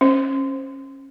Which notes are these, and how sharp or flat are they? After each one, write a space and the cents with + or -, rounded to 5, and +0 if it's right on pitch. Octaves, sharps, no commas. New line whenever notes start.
C#4 -25 C5 +0